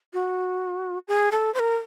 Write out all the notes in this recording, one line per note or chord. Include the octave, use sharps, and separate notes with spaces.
F#4
G#4
A4
C5
A#4